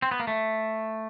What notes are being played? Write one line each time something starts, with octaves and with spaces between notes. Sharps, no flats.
C4
B3
A#3
A3